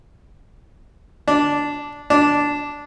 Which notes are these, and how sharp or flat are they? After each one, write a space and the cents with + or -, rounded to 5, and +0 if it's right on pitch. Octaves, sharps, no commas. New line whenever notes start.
D4 -10
D4 -10